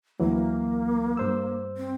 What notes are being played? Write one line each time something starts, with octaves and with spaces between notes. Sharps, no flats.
D2 E3 F#3 A#3
G2 C5 E6
C4